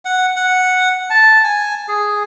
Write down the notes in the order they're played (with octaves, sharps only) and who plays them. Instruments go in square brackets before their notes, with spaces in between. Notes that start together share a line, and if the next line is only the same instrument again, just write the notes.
[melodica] F#5
F#5
A5
G#5
G#4